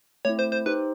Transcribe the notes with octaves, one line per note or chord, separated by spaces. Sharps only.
A3 C4 E4 C#5
C5
C5
D#4 G4 B4 C5